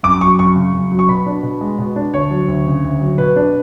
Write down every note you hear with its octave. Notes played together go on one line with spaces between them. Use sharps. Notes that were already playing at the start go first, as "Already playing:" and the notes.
F#2 D6
F#3 C#6
F#2 C#6
C#3
F#2
F#3
C#6
B2 B5
D4
B2
G#3
B2
D4
D2 C#5
F#3
D2
C#3
D2
F#3
B2 B4
D4